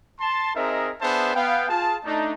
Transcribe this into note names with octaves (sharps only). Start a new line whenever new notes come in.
A5 C6
C4 D#4 G#4 A#4 D#5 E5
B3 D4 G#4 C5 E5 A5
B3 F5 G5
F4 G#4 A5
A3 D4 D#4